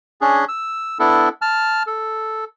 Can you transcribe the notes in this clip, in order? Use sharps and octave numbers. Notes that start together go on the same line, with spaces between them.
C#4 D4 G#4
E6
B3 D4 E4 A4
A5 F6
A4